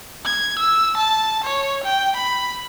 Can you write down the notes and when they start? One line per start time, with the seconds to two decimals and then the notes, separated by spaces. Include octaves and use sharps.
0.25 G#6
0.59 E6
0.97 A5
1.44 C#5
1.84 G5
2.16 B5